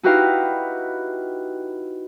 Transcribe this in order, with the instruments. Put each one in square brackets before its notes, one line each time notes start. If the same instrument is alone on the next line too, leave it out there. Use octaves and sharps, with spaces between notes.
[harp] D#4 E4 F#4 G4 B4 F5